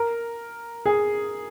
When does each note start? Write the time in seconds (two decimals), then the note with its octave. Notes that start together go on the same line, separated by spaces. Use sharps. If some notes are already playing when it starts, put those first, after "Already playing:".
Already playing: A#4
0.86 G#4